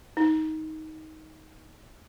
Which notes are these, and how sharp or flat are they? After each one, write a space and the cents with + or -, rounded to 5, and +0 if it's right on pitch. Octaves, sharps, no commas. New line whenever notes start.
D#4 +15